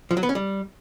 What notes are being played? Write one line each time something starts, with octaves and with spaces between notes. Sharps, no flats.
F3
F#3
B3
C#4
G3